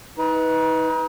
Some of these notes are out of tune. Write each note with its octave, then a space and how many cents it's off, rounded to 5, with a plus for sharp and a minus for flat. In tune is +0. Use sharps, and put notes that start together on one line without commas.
D#4 +35 B4 +0